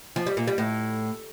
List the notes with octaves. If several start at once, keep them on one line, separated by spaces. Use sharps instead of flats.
F3
G3
A#2
G3
A2